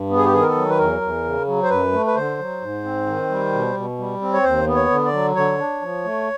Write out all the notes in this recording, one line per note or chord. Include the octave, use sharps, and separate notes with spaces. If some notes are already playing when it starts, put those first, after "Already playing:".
Already playing: G2
B3
G#4
G4
D#3 G#4
A#4
A4
F#3
B4
E2 A#4
E2
C#3
F#3
C5
F#2 B4
A3
B4
D3 C5
F#3
G#2
C4
D#3
G3
B2
B2
G3
C4
C#5
D#2 C5
B3
C#5
D3
D5
F#3
D3 C#5
D4
F3
A3